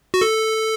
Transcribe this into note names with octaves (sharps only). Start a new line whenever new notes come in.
F#4
A4